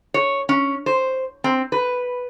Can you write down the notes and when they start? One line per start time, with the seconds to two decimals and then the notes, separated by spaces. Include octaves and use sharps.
0.14 C#5
0.49 C#4
0.86 C5
1.44 C4
1.72 B4